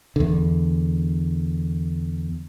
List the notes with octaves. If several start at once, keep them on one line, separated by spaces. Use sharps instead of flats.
E2 D3